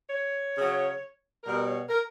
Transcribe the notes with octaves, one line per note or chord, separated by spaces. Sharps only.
C#5
C#3 F#3
B2 G3 A#4
C#5
A#4